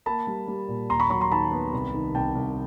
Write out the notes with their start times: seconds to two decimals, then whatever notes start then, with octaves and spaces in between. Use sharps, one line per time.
0.06 A#3 A5 B5
0.27 G3
0.48 G3
0.68 A#2
0.90 D#2 A#5 C6
1.00 B5 C#6
1.10 F#3 B5 C#6
1.21 A#5 C6
1.31 D#3 A5 B5
1.52 B3
1.72 C2
1.94 D#3
2.14 C2 G5 A5
2.35 C2